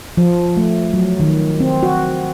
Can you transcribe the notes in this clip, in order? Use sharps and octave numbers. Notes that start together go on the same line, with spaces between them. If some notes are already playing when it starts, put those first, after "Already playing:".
F3
A3
F#3
D#3
C4
F#4